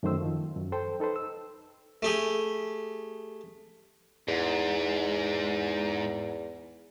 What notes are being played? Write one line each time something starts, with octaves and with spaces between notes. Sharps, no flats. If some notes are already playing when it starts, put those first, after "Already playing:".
F#2 D#3 A3 C5 E6
D#3 F3
F#2
A4 C5 G5
D#4 A4 B4 C5
E6
A3 G4 G#4
E2 G#2